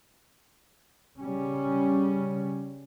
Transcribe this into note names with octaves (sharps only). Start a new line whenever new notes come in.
C#3 G3 C#4